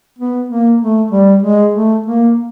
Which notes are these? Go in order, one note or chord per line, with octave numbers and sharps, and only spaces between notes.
B3
A#3
A3
G3
G#3
A3
A#3